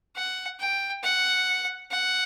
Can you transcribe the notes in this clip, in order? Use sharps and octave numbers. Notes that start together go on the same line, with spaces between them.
F#5
G5
F#5
F#5